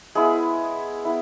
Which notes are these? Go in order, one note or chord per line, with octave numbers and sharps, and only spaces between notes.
G#3 B3 E4 G#4
B3 E4